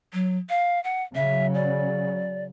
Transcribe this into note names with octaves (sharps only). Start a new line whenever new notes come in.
F#3
F5
F#5
C#3 F#3 E5
D5